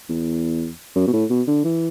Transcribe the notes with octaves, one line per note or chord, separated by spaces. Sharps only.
E2
F#2
B2
A2
B2
D3
E3